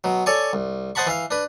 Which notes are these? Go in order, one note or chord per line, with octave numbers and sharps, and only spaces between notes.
B2 F#3
A4 C#5 D5 G#5 C#6
C2
C5 D#5 F#5 A5 B5 C#6
E3 E5 F5
D4 B4